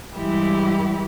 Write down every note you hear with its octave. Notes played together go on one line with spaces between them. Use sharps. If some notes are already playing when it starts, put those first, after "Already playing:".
G2 E3 G#3 E4 G4